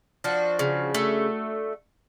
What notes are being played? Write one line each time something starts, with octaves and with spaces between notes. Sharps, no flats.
F3 D4 F#4
C#3
A3